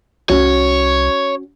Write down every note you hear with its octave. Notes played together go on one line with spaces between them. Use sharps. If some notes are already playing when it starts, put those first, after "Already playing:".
C2 C#4 F#4 C#5